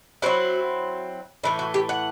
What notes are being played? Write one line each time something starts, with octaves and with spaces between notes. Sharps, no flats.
F#3 C4 E4 F#4
A2 E3 A3 E4
F#4
G4
F#5